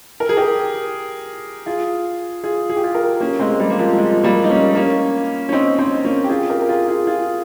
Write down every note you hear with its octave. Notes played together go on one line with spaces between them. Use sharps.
A#4
G#4
G4 A#4
F4 G#4
F4 G#4
G#4
G4
F4 G#4
G4 A#4
A#3 C#4
G#3 C4
G#3
G3 A#3
A#3
F3 G#3
F3 G#3
G3 A#3
D#4
A#3 C#4
A#3 C#4
C#4
C4 D#4
C4 D#4
A#3 C#4
G4
F4 G#4
G4 A#4
A#4
F4 G#4
F4 G#4
F4 G#4